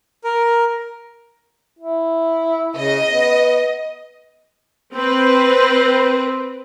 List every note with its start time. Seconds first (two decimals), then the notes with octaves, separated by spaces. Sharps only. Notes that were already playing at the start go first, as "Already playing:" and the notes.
0.24 A#4
1.79 E4
2.77 C#3 D#5
3.12 B3
4.92 C4 B4